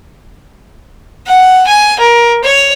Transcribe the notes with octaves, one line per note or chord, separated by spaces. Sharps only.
F#5
G#5
A#4
C#5